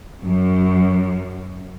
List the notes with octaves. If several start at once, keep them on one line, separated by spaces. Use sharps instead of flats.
F#2